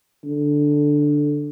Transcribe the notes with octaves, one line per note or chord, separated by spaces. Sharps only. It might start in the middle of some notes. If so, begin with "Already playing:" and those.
D3